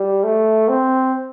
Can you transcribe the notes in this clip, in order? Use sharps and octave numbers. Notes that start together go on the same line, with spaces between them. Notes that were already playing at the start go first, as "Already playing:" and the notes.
Already playing: G3
A3
C4